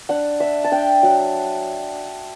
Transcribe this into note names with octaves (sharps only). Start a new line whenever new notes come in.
D4 F#5
D4 E5
A5
D4 G5
F#3 F#5